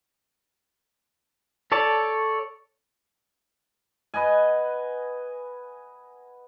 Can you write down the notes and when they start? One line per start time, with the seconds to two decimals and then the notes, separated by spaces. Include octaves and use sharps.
1.72 A4 C#5 D5 A5
4.14 B4 D#5 F#5 G#5